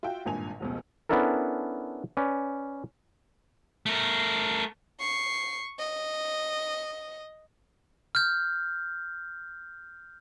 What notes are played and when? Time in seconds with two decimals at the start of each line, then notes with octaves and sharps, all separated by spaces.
0.03 F4 F#4 E5 G5
0.26 G#1 G2 A#2 G#5 F7
0.60 F1 C#2 B2
1.09 B3 C#4 D4 E4 A4 A#4
2.17 C#4 B4 D5
3.86 A3 A#4
5.00 C#6 C7
5.79 D#5
8.15 F6 G6